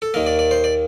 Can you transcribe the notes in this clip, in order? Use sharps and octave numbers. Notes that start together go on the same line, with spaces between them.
A4
D#2 D#3 A#3 A#4
D5
D5
C5
D5